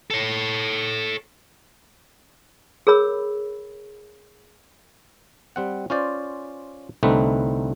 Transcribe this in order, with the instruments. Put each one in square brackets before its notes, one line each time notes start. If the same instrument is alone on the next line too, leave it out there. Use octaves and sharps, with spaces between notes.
[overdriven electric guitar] A4 C#5
[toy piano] G#4 A#4 C#5 B5 E6
[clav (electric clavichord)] G3 C4 F#5
C#4 F4 C5 D5
C2 D3 A3 C4 D#4 B4